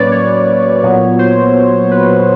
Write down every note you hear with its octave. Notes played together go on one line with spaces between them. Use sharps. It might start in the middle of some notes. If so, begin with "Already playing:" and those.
Already playing: A2 F#3 A#3 C#4 B4 C#5 D5
C#5
A#2 F#3 B3
C5
B4